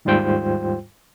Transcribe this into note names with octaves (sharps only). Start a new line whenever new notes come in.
D#2 G#2 G3 F4 C5 G5